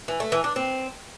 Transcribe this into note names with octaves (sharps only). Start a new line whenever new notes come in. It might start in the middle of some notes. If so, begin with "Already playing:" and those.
E3
A3
E3
D4
C4